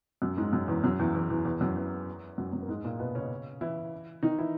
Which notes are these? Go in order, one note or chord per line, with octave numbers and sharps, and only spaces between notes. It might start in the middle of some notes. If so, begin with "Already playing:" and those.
F#2 F#3
G#2 G#3
F#2 F#3
E2 E3
F#2 F#3
E2 E3
E2 E3
E2 E3
E2 E3
F#2 F#3
E2 E3
F#2 F#3
F#2 F#3
A#3
G#2 G#3
A#2 A#3
B2 B3
C#3 C#4
E3 E4
D#3 D#4
E3 E4